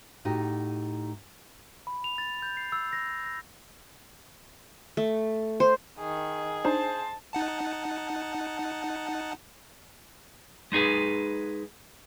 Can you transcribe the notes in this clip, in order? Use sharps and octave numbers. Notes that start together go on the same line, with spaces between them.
A2 D#4 F#4 G4
B5
F7
A6
G6
C7
E6
A#6
A#6
A3
C5
D#3 G#4
D4 D#4 C5 A5
D#4 F#5 A5
G#3 D#4 G#4 B4